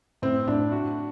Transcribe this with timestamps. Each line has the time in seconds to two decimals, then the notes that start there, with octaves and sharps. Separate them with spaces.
0.22 A2 C4
0.47 A2 D4
0.72 F#4